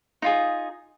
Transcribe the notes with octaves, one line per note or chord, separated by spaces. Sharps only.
D#4 F4 G#4